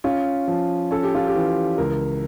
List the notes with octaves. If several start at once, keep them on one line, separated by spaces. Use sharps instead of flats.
C#4 F4
F3
C#4 A4
G4
F4
G4
E3
C#2 A#4